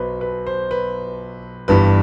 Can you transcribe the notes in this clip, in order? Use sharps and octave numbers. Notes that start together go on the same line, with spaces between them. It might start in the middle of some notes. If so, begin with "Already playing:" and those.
Already playing: B1 B2 F#3 B4 C5
B4
C5
B4
G1 G2 E3 B4